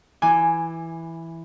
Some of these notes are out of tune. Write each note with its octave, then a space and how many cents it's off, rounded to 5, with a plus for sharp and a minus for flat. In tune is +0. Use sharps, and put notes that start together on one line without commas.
E3 +0 G#5 +0 D6 +10